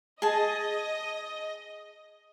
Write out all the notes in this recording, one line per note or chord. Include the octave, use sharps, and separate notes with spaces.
G#4 D#5 A5